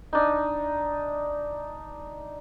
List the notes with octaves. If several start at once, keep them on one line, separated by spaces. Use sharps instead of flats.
D4 D#4